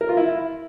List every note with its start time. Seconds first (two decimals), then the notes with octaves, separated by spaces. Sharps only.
0.01 A#4
0.09 F4
0.17 E4